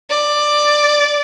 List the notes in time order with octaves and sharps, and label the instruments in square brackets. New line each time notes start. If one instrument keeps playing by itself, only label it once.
[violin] D5